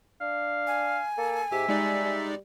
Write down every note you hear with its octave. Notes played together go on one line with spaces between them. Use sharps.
D4 F5
G#5
A#3 A4
G#2 G4 E5
G3 G#3 D#4 D5
G3